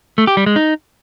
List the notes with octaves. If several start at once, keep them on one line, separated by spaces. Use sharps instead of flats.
A3
G4
G3
G#3
D#4